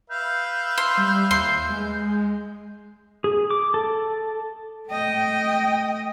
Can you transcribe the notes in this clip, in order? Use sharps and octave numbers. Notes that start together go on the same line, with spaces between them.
B4 E5 F5 G6
C6
G3
D#2 C6
G#3
G#4
D6
A4
A3 D#5 G5